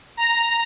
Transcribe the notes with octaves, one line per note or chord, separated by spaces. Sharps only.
A#5